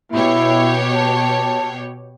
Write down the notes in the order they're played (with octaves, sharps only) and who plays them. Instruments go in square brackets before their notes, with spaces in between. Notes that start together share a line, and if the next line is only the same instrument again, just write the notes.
[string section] B2 G4 C#5 [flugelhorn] E4
[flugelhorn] A5